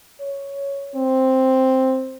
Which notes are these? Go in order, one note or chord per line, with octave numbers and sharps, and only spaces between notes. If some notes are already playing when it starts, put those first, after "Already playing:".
C#5
C4